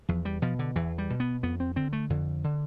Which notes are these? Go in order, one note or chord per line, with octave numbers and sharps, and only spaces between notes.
E2 F3
G3
B2 F3
D3
E2 E3
G3
B2
B3
F2 B3
C4
D3 C4
A3
F2 D3
D3